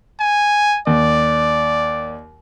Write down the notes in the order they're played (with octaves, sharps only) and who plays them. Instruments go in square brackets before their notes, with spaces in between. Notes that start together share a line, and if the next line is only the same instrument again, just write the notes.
[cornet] G#5
[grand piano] D#2 [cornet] D5